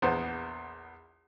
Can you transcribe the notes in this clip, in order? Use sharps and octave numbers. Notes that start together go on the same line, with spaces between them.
A#1 E2 B3 C5